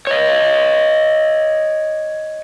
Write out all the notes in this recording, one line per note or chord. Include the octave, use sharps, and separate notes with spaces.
C#5 D#5